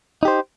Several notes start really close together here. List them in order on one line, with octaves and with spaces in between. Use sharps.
D#4 G4 C5